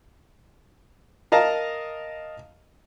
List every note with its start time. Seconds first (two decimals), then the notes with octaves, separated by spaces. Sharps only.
1.32 A#4 D#5 F5 A5 A#5